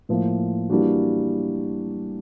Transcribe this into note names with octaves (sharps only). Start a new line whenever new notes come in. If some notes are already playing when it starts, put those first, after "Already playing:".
A2 F3 A#3
E3 G3 A#3 D4 F#4